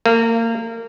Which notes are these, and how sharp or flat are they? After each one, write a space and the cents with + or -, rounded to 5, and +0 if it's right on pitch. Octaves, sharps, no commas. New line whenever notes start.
A#3 -30